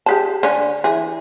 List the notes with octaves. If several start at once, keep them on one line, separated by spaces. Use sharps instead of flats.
G4 G#4 A5
D3 C#4
E3 G#4